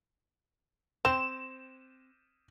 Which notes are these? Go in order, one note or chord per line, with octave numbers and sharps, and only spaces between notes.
C4 E7